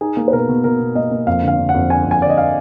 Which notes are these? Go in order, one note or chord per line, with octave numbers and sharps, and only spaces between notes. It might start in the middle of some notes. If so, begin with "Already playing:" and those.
D#4 G#4
A#3
B4
B2 A#4
B2
B2 A#4
B2
A#3 D#5
A#3
F2 F5
D3
F5
D3
F#5
F2
D3 G#5
F2
G#5
D3 D5
D#5
F5